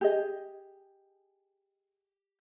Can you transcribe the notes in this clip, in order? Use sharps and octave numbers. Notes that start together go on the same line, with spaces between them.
G4 G#4 D#5